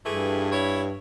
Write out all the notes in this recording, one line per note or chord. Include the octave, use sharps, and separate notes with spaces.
G2 E3 A3 G#4
E4 C#5